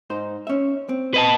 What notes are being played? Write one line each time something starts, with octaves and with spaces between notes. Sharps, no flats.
G#2 D#4 C5
C#4 E5
C4
B4 D#5 A5